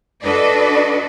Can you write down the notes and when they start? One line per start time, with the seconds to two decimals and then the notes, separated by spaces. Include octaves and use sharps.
0.24 D4 F#4 A4 B4 D5 D#5